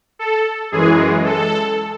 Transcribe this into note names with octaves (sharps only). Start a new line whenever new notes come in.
A4
F#2 E3 G#3 G#4
A4